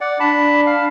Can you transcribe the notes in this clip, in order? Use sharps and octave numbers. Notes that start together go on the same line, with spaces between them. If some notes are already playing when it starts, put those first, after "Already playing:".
D5 F#5
D4 A5 B5
F5